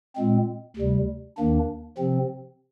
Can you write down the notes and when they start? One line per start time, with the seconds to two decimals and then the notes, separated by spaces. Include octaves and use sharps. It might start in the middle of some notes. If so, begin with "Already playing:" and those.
0.16 A#2 G#3 C4
0.77 D2 C3 G3
1.38 D#2 D#3 A#3 D4
1.98 C3 F3 C4